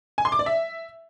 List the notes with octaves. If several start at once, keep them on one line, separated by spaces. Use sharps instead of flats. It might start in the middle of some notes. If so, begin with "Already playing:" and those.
G#5
C6
D6
D5
E5